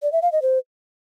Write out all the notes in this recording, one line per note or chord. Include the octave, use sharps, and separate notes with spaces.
D5
E5
F5
D#5
C5